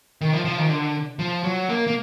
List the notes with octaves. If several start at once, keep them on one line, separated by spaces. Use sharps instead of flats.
D#3
F3
F3
D#3
D3
F3
F#3
A#3
A#3